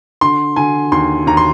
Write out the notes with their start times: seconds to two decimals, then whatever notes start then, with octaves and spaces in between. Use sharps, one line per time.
0.21 D3 C6
0.56 D3 G#5
0.92 D#2 C6
1.27 D#2 A#5
1.37 C6